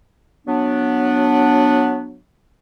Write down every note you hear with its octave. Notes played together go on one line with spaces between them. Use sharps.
F#3 B3 D4